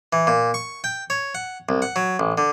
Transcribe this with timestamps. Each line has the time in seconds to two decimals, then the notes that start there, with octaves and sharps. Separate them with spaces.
0.13 E3
0.27 A#2
0.54 C#6
0.84 G5
1.10 C#5
1.35 F#5
1.69 C2
1.82 F#5
1.96 F#3
2.19 A1
2.38 D3